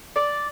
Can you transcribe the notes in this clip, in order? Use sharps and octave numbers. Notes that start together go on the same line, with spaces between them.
D5